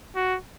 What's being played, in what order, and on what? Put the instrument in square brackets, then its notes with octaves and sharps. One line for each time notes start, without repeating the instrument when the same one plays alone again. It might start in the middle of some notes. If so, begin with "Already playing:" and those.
[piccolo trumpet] F#4